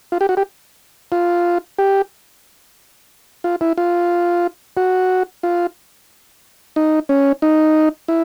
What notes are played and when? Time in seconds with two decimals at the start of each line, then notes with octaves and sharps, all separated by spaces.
0.12 F4
0.21 G4
0.29 F#4
0.37 G4
1.12 F4
1.78 G4
3.44 F4
3.61 E4
3.78 F4
4.77 F#4
5.43 F4
6.76 D#4
7.09 C#4
7.42 D#4
8.08 E4